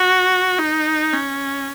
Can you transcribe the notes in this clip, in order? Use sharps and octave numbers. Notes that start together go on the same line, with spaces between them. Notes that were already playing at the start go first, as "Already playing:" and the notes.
Already playing: F#4
D#4
C#4